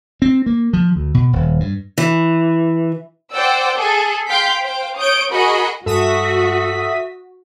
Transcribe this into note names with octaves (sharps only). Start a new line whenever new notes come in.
C4
A#3
F3
D2
B2
D#1
G2
E3
C5 D5 F#5 G5 E6
G#4 A4
F5 G5 C6 G6 B6
C5 F5 G5
C#5 D#6 G6 D7
F#4 G#4 A#4 D#5 F#5 B5
G2 F#4 A4 E5 D#6 B6